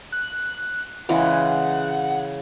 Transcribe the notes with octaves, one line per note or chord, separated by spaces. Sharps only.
F#6
C#3 E3 G#3 F#5